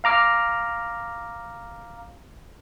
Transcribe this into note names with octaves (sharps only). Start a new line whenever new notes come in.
F5 A#5 D6 F6